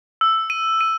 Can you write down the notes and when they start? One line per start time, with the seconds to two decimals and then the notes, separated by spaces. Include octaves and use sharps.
0.21 E6
0.50 D#7
0.81 D#7